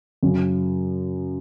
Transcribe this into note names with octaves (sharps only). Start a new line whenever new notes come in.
F#2 C#3 F#3